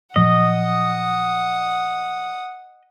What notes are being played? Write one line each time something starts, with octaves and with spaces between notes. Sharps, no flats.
A#2 F3 F#3 D#5 F#5 D#6